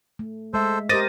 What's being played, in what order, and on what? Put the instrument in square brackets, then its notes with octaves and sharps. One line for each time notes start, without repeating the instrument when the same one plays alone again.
[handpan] A3
[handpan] G#3 E5 [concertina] A4 C5
[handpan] G4 A#4 C5 [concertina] D#5 D6 [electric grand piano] A6 A#6 D#7